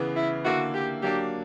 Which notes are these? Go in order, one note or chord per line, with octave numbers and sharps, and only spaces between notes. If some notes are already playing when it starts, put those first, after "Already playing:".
Already playing: C#3 E3 B3
E4
D3 A#3 E4 F#4
G4
F#3 A#3 D4 G4